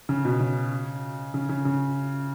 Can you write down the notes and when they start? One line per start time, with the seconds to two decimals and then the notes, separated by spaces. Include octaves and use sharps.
0.09 C#3
0.25 B2
0.40 C#3
1.34 C#3
1.49 C#3
1.65 C#3